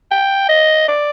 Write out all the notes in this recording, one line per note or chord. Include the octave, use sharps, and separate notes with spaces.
G5
D#5
D5